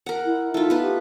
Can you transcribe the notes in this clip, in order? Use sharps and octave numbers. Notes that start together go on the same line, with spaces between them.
A#4 F#5
E4
A3 D#4 F4
B3 B4
G4